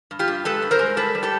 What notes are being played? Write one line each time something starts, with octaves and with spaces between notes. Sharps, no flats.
G2
F4 G4
G2
G#3 A4 B4
G2
A#4 C5
G#3
G3 A4 B4
G3
G4 A4